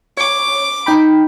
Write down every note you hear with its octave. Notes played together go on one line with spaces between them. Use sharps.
C#5 D6
D#4 G5 B5